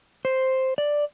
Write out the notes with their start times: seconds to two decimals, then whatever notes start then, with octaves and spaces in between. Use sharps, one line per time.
0.25 C5
0.78 D5